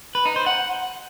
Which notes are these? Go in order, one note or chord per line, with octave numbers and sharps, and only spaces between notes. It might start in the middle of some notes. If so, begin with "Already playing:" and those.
B4
D#4
C5
F#5